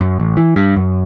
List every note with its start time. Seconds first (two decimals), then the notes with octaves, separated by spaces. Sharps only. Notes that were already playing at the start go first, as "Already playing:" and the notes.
0.01 F#2
0.20 A1
0.37 E3
0.56 G2
0.76 F#2